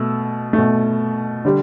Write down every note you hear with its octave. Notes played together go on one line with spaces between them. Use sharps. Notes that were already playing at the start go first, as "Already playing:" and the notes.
Already playing: B2 A3 E6
A3
B2
D3 G3